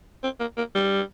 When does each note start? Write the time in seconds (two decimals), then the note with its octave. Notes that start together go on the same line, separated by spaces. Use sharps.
0.23 C4
0.40 A#3
0.58 A#3
0.75 G3